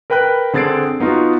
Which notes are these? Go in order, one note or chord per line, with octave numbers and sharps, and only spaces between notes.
A#4 B4 G5 B5 F#6
D3 C4 G#4 A6 C7 D7
B3 D#4 F4 F#4